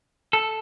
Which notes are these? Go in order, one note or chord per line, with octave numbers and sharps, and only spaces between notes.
A4